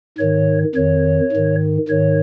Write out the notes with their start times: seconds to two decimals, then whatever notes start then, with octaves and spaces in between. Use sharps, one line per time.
0.18 G#2 D#3 C#5
0.75 F2 D#3 C#5
1.32 G#2 D#3
1.88 G#2 D#3 C#5